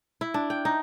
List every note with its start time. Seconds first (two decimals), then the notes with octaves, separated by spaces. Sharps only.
0.21 E4
0.34 D4
0.50 G5
0.65 D#4